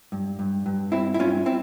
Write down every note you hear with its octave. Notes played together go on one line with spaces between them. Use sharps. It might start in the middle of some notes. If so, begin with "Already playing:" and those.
G2
G2
G2
G2 C4 E4
E4
G2 C#4 F4
C4 E4